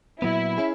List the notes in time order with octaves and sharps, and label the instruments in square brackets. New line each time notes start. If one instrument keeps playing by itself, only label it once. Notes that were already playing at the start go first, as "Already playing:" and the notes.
[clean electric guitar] A#2 F#3 B3 [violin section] E4
[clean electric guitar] C#4 E4 G#4